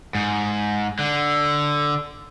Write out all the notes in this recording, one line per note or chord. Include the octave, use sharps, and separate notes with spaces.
G#2
D3